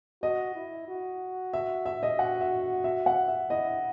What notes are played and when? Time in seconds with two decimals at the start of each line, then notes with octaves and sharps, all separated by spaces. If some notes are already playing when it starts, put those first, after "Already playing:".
0.22 F#4 D#5
0.55 E4
0.88 F#4
1.53 E5
1.86 E5
2.03 D#5
2.19 F#4 F#5
2.41 E5
2.84 E5
3.06 F#5
3.28 E5
3.50 E4 D#5